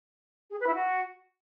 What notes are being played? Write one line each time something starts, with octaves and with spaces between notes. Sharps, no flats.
G#4
B4
E4
F#4